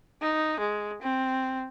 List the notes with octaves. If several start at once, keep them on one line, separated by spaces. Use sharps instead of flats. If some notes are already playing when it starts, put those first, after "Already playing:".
D#4
G#3
C4